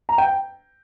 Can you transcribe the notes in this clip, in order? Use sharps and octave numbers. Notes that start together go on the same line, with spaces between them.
A#5
G5